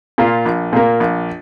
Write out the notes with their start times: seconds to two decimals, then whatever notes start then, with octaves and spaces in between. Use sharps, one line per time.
0.18 A#2 A#3 F4
0.46 A#1
0.73 A#2 A#3
1.00 A#1